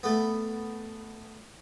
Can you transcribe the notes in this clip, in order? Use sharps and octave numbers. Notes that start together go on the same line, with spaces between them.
A3 B3